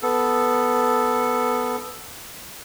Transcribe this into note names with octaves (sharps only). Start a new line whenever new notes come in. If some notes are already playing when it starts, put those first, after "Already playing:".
B3 A4